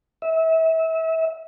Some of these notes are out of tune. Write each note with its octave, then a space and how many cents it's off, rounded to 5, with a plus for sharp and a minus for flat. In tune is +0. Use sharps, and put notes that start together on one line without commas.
E5 -30